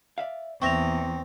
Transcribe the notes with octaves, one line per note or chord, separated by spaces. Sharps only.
D5 E5 F5
E2 A#2 C4 E5 C#6 A#6 F7